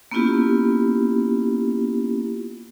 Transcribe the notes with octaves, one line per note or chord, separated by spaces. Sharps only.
A#3 B3 C#4 E4 F4 G4